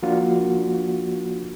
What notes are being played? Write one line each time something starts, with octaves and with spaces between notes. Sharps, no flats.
F3 A#3 D4 F4 F#4